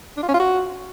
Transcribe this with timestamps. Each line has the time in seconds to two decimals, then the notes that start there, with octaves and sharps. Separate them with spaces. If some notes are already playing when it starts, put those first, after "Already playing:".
0.17 D4
0.22 F4
0.28 C#4
0.34 F4
0.39 F#4